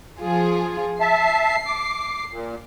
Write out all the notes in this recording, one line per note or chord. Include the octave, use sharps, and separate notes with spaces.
F3 F4 G#4
E5 A5 C7
D6
A#2